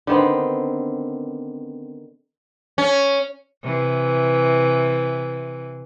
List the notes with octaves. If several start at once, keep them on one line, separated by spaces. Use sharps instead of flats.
D3 D#3 B3 C4
C#4
C3 E3